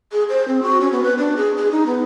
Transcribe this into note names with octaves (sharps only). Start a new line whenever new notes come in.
G#4
C5
C4
F#4
C#4
B3
B4
D4
G#4
G#4
D#4
B3